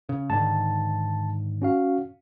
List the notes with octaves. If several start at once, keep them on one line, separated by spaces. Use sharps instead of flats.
C#3
G#2 D3 D#3 A5
C#4 F#4 F5